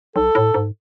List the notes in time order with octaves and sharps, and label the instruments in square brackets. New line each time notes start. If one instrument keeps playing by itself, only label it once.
[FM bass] B1 [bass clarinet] A4
[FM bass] A2
G#2